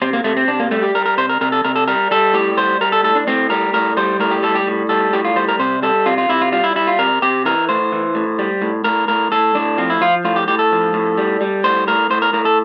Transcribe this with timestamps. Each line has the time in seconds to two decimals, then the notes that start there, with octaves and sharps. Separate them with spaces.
0.02 C3 C4
0.13 A#3
0.24 C3 A3
0.37 C4
0.48 C3 D4
0.60 A#3
0.71 G3 A3
0.83 G4
0.95 G3 A#4
1.06 A#4
1.18 C3 C5
1.29 A#4
1.41 C3 A#4
1.52 A4
1.65 C3 A#4
1.76 A4
1.88 G3 A#4
2.11 G3 A4
2.34 A2 G4
2.58 G3 C5
2.81 G3 A#4
2.92 A4
3.03 A2 A4
3.15 D4
3.27 A2 C4
3.50 G3 A#4
3.74 A2 A#4
3.97 G3 C5
4.20 A2 A#4
4.31 G4
4.43 G3 A4
4.55 G4
4.67 A2
4.89 G3 A4
5.13 A2 G4
5.25 F4
5.36 G3 C5
5.48 A#4
5.59 C3 C5
5.83 G3 A4
6.06 C3 F4
6.18 F4
6.29 C3 E4
6.42 F4
6.52 G3 F4
6.64 E4
6.76 G3 E4
6.87 F4
6.99 C3 A#4
7.22 C3 G4
7.45 E3 A#4
7.69 A2 C5
7.92 E3
8.15 A2
8.39 G3
8.62 A2
8.84 A2 A#4
9.08 A2 A#4
9.32 A2 A4
9.55 A2 D4
9.78 F3 C4
9.90 E4
10.01 F3 F4
10.25 A2 F4
10.36 G4
10.48 A2 G4
10.59 A4
10.72 F3
10.94 A2
11.18 G3
11.41 G3
11.64 A2 C5
11.87 A2 A#4
12.10 A2 C5
12.22 A#4
12.33 A2 A#4
12.45 A4